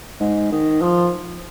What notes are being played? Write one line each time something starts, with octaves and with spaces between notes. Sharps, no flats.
G#2
D#3
F3